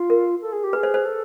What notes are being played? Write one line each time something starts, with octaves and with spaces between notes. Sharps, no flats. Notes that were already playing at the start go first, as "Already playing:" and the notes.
Already playing: F4
A#4
A4
G#4
G4
G#4 B4
C5
C5
A4